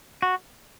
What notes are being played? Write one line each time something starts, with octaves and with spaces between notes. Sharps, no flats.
F#4